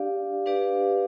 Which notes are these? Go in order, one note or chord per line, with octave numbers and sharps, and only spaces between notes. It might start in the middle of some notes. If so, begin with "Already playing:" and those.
Already playing: D4 G4 D5 F5
D4 G4 B4 D5 F5